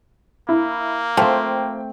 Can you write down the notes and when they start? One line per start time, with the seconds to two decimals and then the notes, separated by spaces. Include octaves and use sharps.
0.49 A#3 E4
1.17 F3 A3 C4 G5